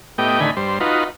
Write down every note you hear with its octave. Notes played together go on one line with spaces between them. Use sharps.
A2 B3 G4 D#5 G5
A2 D3 D#3 G#5 B5
G2 C5
D#4 F4 F#4 B4